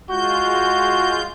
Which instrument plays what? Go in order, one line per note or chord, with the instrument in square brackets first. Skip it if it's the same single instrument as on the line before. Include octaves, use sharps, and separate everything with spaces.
[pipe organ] G#3 F4 G6 [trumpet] F#4